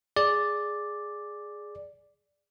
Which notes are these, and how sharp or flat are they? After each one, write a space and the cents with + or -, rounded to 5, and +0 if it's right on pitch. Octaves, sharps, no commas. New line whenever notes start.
G#4 +0 D5 +0